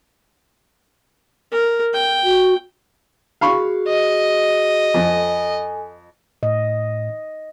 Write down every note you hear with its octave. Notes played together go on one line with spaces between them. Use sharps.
A#4
G5
F#4
F#4 G#4 F5 B5 C#6
D#5
F2 A4 G#5
A2 D#5